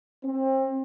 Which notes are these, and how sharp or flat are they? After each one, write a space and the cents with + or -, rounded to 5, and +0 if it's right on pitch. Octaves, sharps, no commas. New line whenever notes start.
C4 +30